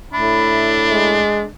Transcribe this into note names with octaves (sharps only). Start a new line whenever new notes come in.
A2 D4 E5 B5
G#3